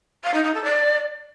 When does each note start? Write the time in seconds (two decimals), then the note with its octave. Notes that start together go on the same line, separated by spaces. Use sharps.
0.23 F5
0.34 D#4
0.44 D#4
0.54 A4
0.64 D5